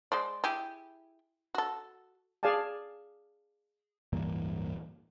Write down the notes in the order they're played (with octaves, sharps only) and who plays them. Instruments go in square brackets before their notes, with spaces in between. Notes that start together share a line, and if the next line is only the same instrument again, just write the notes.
[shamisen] G#3 C5 D5
E4 G4 G#4
F#4 A4
[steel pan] G#4 D5 F5 G#5 A5
[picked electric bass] D1 G2 E3 A#3